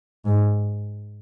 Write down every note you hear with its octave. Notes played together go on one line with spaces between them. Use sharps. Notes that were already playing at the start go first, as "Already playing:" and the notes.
G#2